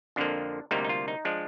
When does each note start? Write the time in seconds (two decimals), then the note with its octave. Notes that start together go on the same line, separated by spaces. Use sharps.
0.16 F2 D3 F3 A#3 D4
0.71 D2 C3 G3 A#3 D#4
0.84 D#4
0.89 F4
1.08 D#4
1.25 F3 G#3 D4